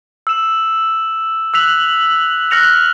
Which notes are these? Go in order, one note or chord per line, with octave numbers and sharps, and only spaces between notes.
E6 E7
E6 F#6 B6 F7 F#7
F6 F#6 A#6 C#7 F7 F#7